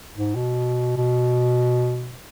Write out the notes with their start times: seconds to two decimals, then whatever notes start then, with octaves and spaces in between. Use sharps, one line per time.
0.15 G#2
0.36 B2
0.97 B2